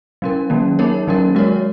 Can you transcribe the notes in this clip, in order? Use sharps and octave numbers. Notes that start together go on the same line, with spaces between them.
F#3 C#4 A#4
D#3 F#3 A#3 C#4
A#3 D#4 A#4 C#5
D#3 F#3 A#3 C#4 A#4
G#3 F#4 A#4 C#5